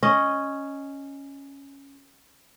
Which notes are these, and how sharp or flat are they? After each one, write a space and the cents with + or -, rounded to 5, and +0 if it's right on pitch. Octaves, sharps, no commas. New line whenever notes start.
C#4 +0 D#5 +0